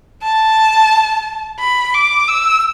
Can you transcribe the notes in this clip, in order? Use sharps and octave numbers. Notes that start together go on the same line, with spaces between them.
A5
B5
D6
E6